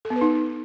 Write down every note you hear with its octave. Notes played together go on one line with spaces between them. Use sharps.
A4
B3
B4
D#4